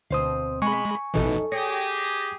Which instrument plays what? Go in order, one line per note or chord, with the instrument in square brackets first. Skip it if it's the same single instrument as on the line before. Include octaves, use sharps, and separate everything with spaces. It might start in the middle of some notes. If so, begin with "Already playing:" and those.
[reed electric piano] D2 C5 D#6 [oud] B2 C4 F5
[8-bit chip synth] G#3 B5 [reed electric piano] G#5 C#6
[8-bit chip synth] A1 B2 E3 [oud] F#2 D#4 A4
[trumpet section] G4 G#4 [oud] C#5 [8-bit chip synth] A#6